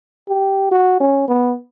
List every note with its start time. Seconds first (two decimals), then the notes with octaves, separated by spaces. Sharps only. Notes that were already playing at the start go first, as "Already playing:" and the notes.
0.28 G4
0.71 F#4
1.00 C#4
1.28 B3